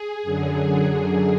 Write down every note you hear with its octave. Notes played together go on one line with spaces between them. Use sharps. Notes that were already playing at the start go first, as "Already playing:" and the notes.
Already playing: G#4
F#2 D3 F#3